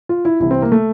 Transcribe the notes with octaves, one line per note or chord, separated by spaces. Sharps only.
F4
E4
C2 C3 E3 E4
C4
A#3
A3